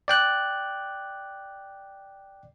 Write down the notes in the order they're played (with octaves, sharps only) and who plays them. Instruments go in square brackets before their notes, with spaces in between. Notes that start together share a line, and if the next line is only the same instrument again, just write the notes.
[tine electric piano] D5 G5 F#6